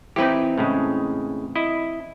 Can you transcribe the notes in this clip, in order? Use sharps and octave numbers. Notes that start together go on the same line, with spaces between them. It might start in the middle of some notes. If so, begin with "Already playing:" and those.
E3 C4 D#4 G4 B4
A2 C#3 G#3
E4 D#5